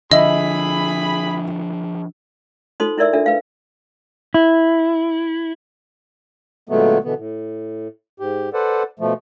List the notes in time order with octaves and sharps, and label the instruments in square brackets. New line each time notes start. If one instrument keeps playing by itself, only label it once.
[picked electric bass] D3 F3 [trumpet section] G#4 B5 [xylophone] D#5 [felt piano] E5
[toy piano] D#4 F4 A4 C5 C6 D#6
D#4 E4 A#4 D5 E5 E6
D4 F4 A4 E5
B4 F5
[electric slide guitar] E4
[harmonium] A#2 D3 F#3 G#3 A3 B3
B2 D3 E3 B3
A2
G#2 G4
A4 B4 C5 D5 F#5
B2 F3 A3